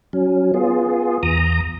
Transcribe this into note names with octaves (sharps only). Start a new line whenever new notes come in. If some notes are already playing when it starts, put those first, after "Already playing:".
F#3 C#4
B3 F4 G#4
E2 A#5 D#6